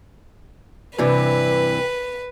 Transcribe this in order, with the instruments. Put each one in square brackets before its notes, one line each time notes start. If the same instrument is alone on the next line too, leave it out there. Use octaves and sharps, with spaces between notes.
[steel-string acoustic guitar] G2 C3 E3 [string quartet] B4